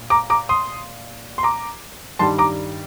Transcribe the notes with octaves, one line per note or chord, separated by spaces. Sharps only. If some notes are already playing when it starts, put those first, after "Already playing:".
Already playing: A#2
A#5 D6
A#5 D6
C6 D#6
C6
A#5 D6
G2 D#3 G3 A5 C6
A#5 D6